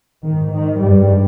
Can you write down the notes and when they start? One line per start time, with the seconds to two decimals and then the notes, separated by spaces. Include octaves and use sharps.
0.24 G#2 D#3
0.52 D#3
0.80 G2 G3